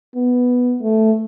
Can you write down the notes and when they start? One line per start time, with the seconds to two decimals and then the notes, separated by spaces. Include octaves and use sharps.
0.15 B3
0.81 A3